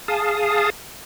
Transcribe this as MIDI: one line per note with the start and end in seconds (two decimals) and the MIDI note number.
0.08 0.70 68
0.08 0.70 77
0.08 0.70 81
0.08 0.70 87